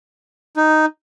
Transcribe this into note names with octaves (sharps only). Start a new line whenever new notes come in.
D#4